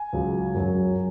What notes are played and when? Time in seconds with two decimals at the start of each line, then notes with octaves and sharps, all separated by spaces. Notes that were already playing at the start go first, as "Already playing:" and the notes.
Already playing: G#5
0.13 C#2 C#3 F#3
0.54 F#2 F#3 C#4